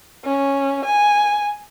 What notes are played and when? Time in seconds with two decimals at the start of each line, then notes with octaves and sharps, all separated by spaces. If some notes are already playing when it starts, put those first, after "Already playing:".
0.25 C#4
0.85 G#5